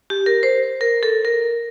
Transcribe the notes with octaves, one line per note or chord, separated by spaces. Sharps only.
G4
A#4
C5
A#4
A4
A#4